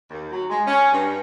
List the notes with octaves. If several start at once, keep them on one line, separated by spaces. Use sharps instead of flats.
D#2
F#3
G#3
C#4
G2